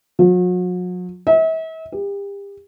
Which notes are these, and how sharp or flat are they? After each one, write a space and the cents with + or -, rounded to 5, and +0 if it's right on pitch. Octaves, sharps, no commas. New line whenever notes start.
F#3 -40
E5 -40
G4 +35